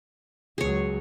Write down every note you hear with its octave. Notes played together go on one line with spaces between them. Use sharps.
C#2 F#3 G#4 C#5